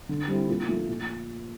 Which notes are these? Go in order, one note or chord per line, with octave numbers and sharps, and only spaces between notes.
D3
G3 C4 E4
A#2
F3 A3
A#2